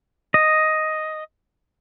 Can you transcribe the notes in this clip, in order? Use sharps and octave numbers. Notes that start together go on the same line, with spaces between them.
D#5